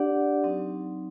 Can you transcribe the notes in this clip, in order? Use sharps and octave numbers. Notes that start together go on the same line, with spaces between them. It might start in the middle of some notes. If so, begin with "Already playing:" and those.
Already playing: D4 G4 D5 F#5
F#3 C4 D#4